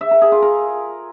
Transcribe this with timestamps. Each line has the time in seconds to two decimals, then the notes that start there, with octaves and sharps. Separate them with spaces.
0.01 E5
0.11 A#4
0.22 G#4
0.32 F4
0.42 A#4